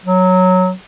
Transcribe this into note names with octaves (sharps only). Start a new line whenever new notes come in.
F#3